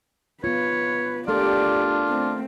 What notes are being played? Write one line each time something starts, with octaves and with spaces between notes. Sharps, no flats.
B3 F4 B4 C#5
A3 D4 F4 G4 A4 A#4 D5
A3 C4